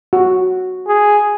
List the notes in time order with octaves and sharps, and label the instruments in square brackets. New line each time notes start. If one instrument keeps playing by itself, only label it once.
[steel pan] F#4
[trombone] G#4